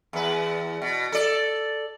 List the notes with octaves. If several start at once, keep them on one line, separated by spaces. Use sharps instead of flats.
E2 B4
B2
A4 D5